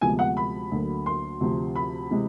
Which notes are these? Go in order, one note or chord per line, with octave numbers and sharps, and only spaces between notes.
D2 C3 F3 G#3 B3 G#5
F#5
B5
D2 D3 F#3 A#3
C6
D2 C3 F3
B5
C3 E3 G#3